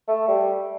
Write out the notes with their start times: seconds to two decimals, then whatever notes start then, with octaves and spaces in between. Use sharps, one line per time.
0.08 A3
0.28 G3